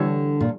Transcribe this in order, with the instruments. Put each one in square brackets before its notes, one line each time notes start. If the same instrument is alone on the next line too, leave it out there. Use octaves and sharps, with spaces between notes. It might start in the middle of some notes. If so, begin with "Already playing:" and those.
Already playing: [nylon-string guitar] D3 [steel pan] E3 G3 D4 A4 C#5
[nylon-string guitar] A#2